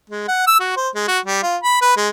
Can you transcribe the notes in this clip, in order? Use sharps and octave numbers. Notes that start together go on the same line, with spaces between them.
G#3
F#5
E6
F#4
C5
G#3
F#4
G3
F4
B5
B4
G#3